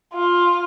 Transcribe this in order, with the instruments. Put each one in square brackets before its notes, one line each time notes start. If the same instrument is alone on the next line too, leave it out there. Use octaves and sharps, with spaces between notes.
[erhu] F4